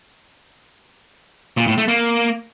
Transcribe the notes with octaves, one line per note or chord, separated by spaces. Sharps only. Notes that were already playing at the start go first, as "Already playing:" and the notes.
A#2
A2
A3
A#3